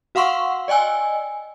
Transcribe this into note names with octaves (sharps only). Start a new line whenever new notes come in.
F#4 F5 F#5 C6 C#6 E6
D5 D#5 G5 G#5 E6